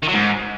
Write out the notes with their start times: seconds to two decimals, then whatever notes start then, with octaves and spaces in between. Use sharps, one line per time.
0.03 D#3
0.09 F#3
0.14 G#2